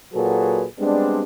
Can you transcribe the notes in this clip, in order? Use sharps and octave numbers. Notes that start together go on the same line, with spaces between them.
A#2 F#3 F#4 G#4 A4 B4
G3 G#3 B3 C4 D4